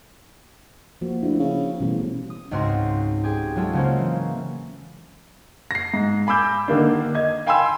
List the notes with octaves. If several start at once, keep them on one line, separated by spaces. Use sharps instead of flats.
F3 A#3 F#4
D2 E4
C#3
A1 B2 E3 G3
D#6
C#2 G#2 C4 F#4 C6 A#6
G4 G#4 G5
F#3 G#3 F4 A4
C#3 G#3 A#3 C#4 C5
E3
A#6 C7
G#2
G#5 B5 D6 E6 G6
D3 D#3 A#3 D4
D#5 G#6
F5 G5 G#5 B5 C6 E6